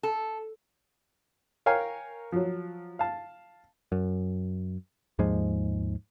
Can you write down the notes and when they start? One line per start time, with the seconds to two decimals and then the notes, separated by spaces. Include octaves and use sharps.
0.03 A4
1.66 A#4 C#5 F5 G5 G#5 A#5
2.32 F3 F#3
2.99 F5 A5
3.92 F#2
5.19 D#2 G#2 F3 G#3